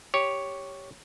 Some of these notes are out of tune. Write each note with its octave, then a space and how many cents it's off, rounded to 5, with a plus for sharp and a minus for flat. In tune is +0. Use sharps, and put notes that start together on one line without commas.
G4 +0 C#5 +0